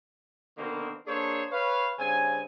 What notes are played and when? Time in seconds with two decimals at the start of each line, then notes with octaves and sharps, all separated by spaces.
0.58 B2 D3 D#3 A#3 C4 F#4
1.07 A#3 D4 G#4 A4 C5 C#5
1.52 B4 C#5 F5
1.99 G2 C#3 C4 G#5